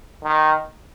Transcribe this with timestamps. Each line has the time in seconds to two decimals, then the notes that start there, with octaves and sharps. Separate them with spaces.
0.24 D#3